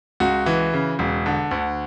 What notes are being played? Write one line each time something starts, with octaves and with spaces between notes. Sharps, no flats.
C#2 F#4
E3
C#3
E1
D3
D2